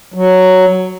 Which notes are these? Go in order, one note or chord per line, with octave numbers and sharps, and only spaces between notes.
F#3